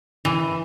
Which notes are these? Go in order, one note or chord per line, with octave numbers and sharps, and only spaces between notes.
E3